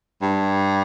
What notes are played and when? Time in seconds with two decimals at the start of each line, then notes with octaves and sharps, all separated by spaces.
0.22 G2